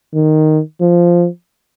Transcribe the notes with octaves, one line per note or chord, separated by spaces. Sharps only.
D#3
F3